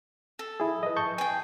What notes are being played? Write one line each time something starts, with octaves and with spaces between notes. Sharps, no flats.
A4
E4 G#4
B4 D#5
A5 C#6 G6
G#4 G5